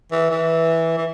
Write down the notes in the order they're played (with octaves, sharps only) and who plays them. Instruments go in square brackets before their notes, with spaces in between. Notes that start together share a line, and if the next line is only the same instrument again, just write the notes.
[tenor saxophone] E3
E3
E3